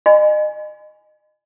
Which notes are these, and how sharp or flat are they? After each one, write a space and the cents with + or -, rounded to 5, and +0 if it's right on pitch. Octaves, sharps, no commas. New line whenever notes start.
D#5 -30 G#5 +0 B5 +45